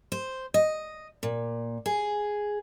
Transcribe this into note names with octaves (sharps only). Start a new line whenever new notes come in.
C5
D#5
A#2
G#4